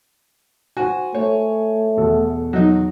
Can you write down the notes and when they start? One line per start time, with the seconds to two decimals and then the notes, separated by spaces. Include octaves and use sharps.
0.77 F#4 C5 G#5
1.15 A3 C#5
1.97 E2 B2 A4
2.53 F#3 D#4